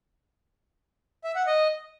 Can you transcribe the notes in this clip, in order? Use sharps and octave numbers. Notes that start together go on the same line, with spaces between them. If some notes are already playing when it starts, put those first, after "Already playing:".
E5
F#5
D#5